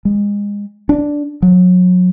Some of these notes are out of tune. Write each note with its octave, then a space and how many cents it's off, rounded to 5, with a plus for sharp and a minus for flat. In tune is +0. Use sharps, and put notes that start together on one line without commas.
G#3 -30
D4 -5
F#3 -30